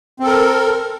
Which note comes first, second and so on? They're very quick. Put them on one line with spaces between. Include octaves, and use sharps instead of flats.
C4 A4 A#4